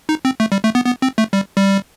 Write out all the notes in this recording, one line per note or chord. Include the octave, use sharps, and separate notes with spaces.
D#4
C4
A3
G3
A3
B3
B3
C4
A3
G3
G3